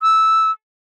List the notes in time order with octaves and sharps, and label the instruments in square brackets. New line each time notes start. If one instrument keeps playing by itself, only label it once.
[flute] E6